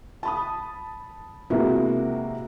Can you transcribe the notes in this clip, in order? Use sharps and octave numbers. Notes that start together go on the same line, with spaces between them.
A5 B5 D#6
C3 G#3 A#3 B3 E4 F#4